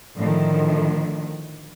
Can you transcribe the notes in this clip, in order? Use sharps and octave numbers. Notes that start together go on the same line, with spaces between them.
A2 D3 D#3 F3